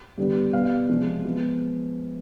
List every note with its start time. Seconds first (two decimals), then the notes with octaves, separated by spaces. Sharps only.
0.18 G2 D3 G3 B3
0.53 B2 G3 B3 F5
0.89 C3 F3 G#3
1.24 F3 G#3 B3